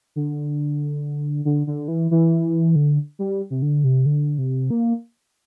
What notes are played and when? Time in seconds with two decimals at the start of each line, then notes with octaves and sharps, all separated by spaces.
0.16 D3
1.45 D3
1.67 D3
1.88 E3
2.11 E3
2.76 D3
3.19 G3
3.50 C3
3.62 D3
3.84 C3
4.06 D3
4.38 C3
4.70 A#3